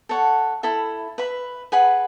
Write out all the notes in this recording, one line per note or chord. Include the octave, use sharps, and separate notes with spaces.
A4 C#5 F#5
E4 A4 E5 B5
B4 E5 B5
G#4 B4 F#5 B5